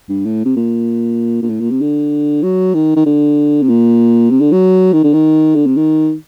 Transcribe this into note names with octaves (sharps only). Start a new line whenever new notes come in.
G2
A2
C3
A#2
A#2
A2
A#2
C3
D3
F#3
D#3
D#3
D3
C3
A#2
C3
D3
F#3
D#3
D3
D#3
D3
C3
D#3